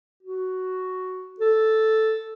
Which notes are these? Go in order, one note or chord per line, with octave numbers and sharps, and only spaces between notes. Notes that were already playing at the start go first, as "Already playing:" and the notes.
F#4
A4